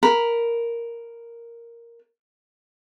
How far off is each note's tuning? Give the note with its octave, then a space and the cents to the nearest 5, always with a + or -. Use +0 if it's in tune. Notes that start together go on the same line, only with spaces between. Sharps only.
A#4 +0 B5 +0